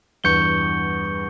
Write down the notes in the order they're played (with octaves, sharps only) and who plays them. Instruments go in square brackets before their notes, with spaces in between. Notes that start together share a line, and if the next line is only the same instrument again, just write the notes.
[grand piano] E2 G2 [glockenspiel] C#6 G6 C#7 G7